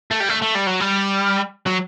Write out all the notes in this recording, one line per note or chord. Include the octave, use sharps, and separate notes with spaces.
A3
G3
A3
A3
G3
F#3
G3
F#3